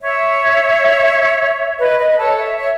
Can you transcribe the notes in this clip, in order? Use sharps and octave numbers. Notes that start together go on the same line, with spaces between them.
C#5 E5
B4 D#5
B4 D#5
B4
A4 C#5
C#5 E5
C#5